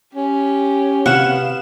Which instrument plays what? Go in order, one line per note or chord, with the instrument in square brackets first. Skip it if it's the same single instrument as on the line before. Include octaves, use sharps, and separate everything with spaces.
[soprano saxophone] C#4 [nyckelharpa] G4
[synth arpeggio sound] C3 F5 E7 [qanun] B3 F#5 C#6